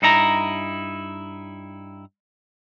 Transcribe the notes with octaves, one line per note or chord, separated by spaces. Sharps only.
G2 D#4 E4 A#5